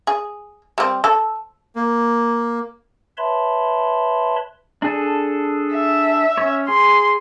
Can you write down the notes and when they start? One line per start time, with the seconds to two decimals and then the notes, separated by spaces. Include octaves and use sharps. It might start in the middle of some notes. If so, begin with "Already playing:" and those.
0.07 G#4
0.78 G3 C4
1.04 A4
1.75 A#3
3.17 B4 C#5 E5 A5 B5 C6
4.82 D4 G#4 A4
5.73 E5
6.37 C#4 C#5
6.68 G#4 C6